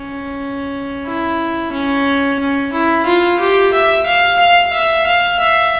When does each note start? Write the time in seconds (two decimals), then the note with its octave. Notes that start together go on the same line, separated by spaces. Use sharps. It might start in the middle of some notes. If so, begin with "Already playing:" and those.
Already playing: C#4
1.06 E4
1.72 C#4
2.40 C#4
2.73 E4
3.06 F4
3.40 G4
3.73 E5
4.06 F5
4.39 F5
4.73 E5
5.06 F5
5.39 E5